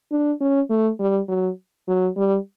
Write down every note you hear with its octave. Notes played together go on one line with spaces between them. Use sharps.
D4
C#4
A3
G3
F#3
F#3
G3